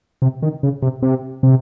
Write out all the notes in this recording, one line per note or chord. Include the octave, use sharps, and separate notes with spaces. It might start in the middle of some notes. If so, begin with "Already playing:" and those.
C3
D#3
C#3
C3
C3
C3